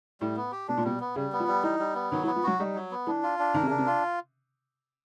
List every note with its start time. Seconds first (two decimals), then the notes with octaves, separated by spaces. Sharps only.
0.21 A2 G3
0.37 B3
0.52 G4
0.68 B2 D4
0.77 A#2
0.84 B2 G3
1.00 B3
1.16 C#3 G3
1.33 B3
1.40 F3
1.48 G3
1.63 E3 D#4
1.80 G3
1.95 B3
2.11 D#3 F#3
2.23 E3
2.27 B3
2.36 F3
2.43 F#3 F#4
2.59 G3 D#4
2.75 F#3
2.91 B3
3.07 E3 D4
3.23 F4
3.39 D4
3.54 D#3 A#4
3.62 C3
3.67 C#3
3.70 D4
3.78 C3
3.86 F4